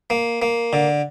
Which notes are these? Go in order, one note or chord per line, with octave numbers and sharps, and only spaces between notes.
A#3
A#3
D3